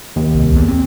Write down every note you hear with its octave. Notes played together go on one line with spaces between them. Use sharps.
D#2
C2
E2 B3
C4